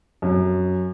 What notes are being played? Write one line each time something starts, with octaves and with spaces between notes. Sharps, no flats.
F#2